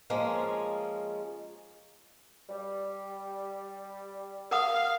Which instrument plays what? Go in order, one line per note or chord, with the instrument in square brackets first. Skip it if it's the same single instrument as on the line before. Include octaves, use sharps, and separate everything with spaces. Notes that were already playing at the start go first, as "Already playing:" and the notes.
[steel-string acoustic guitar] F3 G#3 A#3 C#4
[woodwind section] G3
[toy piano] A#4 F#5 D#6 [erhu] F5